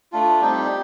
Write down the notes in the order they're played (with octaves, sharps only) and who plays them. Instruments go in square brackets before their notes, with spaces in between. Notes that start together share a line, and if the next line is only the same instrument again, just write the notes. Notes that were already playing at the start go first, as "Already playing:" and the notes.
[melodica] A3 D4 F4
G3 C4 D#4 G4